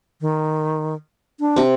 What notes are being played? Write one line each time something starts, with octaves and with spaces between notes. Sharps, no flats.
D#3
D4
C3 C4